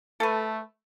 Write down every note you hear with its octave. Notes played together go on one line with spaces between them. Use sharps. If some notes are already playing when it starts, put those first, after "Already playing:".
A3 A4 B4